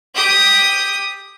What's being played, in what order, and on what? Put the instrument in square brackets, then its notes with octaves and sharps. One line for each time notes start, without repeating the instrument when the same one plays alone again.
[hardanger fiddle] G4 D#6